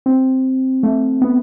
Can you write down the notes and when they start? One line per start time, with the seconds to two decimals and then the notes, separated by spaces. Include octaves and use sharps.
0.06 C4
0.83 A3
1.22 B3